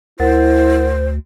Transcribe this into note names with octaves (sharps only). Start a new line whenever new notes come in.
D2 E4 A#4 C5 F#5 A6